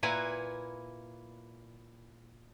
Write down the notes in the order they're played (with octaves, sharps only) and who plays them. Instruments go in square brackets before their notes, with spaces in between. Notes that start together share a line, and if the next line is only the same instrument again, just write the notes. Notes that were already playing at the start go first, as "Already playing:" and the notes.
[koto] A#2 A#3 E4 B4 F#5 G#5